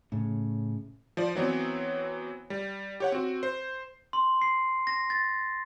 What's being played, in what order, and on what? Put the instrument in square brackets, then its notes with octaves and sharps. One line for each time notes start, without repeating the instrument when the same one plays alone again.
[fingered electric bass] A2 C#3
[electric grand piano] F3 D5
E3 F#3 B3 C4 C#5
G3
G4 C#5 F#5
C4 F#4
C5
[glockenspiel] C6
C7
A#6
A6